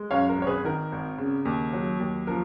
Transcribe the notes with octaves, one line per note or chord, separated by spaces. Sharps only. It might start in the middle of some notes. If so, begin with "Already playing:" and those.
Already playing: G#3
F#2 C#5 F5
A#4
G#1 C#5
G#4 B4
D#3 A#4
G#1
C#3
D#2
F#3
D#2
F3 A#4